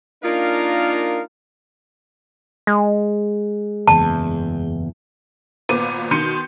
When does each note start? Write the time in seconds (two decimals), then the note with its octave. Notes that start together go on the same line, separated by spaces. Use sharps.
0.23 A#3 D4 D#4 F4 A#4 F5
2.67 G#3
3.88 F#1 E2 A5
5.69 G#1 A#2 B3 D6 D#7
6.11 B2 D#3 C6 G6 C#7 D#7